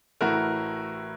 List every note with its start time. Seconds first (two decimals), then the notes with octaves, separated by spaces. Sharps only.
0.21 A1 A2 A3 F#4 A#4